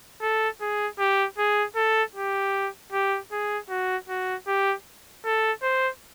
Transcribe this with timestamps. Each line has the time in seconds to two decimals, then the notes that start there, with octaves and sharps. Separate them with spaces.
0.22 A4
0.61 G#4
0.99 G4
1.38 G#4
1.76 A4
2.15 G4
2.92 G4
3.32 G#4
3.70 F#4
4.09 F#4
4.47 G4
5.25 A4
5.63 C5